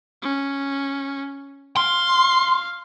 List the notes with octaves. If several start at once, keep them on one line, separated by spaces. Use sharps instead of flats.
C#4
F5 C6